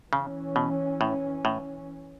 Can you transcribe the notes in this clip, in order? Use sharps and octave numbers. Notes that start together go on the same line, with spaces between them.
C#3 E3 C#4
B2
A2
A2